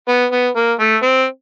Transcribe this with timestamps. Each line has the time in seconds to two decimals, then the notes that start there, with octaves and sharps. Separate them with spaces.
0.08 B3
0.32 B3
0.56 A#3
0.79 A3
1.02 C4